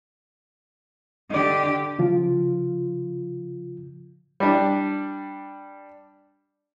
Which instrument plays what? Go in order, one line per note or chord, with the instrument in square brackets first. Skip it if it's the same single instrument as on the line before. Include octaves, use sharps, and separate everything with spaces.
[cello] D3 G4 [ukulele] D#4 D5
[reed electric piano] C#3 F3 F4
[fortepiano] G3 D4